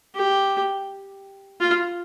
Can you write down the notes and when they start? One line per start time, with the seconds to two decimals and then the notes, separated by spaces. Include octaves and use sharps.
0.15 G4
1.61 F4